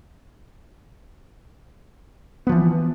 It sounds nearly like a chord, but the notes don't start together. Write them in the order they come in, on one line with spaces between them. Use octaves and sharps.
B3 F3 E3